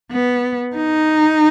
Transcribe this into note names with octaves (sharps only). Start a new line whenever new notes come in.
B3
D#4